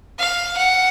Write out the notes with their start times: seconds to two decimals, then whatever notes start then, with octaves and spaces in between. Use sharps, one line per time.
0.19 F5
0.57 F#5